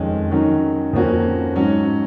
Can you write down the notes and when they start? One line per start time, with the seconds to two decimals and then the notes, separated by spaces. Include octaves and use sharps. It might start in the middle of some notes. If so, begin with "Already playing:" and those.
Already playing: F2 D#3 G#3 C#4
0.31 D#3 F#3 C#4
0.93 F2 F3 A#3 C#4 F#4
1.55 G#2 F#3 C#4